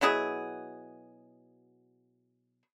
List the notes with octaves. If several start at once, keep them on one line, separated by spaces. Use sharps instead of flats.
B2 F#3 E4 G#4